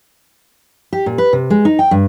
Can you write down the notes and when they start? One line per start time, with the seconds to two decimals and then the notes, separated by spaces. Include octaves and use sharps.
0.93 G4
1.06 A#2
1.18 B4
1.33 C3
1.50 G#3
1.65 D#4
1.79 G5
1.91 G2